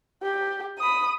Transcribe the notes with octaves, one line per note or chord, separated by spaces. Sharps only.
G4
B5 D#6